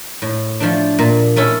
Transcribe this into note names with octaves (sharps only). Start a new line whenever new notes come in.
A2
F3 A3 D4
A#2
A3 C#4 E4 A4